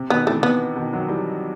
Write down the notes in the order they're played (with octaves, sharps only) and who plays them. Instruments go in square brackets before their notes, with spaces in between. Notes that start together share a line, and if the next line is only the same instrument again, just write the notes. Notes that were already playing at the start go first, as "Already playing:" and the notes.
Already playing: [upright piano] C3
[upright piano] B2 D#3 [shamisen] B3
[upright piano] C3 E3 [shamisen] A3
[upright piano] C3 [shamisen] B3
[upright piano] B2 D#3
D#3 F#3
E3 G3